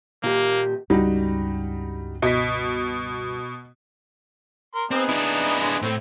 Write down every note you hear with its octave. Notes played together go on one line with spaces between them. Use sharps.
A#2 A#3 G4
C#2 G2 G3 D#4 F#4
B2 D#5 B6
A#4 C6
B3 C4 D#4 G#4
D4 E4
G#3 B3 G#4
A2 A3 C4